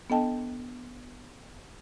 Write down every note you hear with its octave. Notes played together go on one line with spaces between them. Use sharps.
B3 D4 A4 D#5 G5 A5